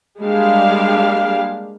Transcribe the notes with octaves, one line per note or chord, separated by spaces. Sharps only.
G3 G#3 A#3 D4 G4 F5